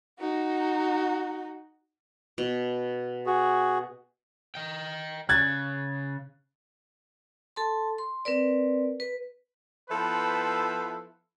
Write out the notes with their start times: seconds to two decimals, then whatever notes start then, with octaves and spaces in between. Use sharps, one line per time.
0.20 D#4 F#4
2.38 B2
3.26 F#4 G#4
4.55 D#5 G5
5.29 C#3 F#6 G#6 A6
7.56 A4 A5 C6
7.98 C6
8.25 C4 A#4 B4 D5
9.00 B4
9.90 F3 B3 E4 A4 B4 C5